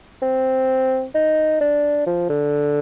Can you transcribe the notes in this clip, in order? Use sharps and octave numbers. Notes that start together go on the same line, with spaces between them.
C4
D#4
D4
F3
D3